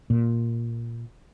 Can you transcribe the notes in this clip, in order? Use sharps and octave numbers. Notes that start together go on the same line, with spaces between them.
A#2